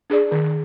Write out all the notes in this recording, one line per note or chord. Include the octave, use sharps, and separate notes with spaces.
D4 G#4 D5
D#3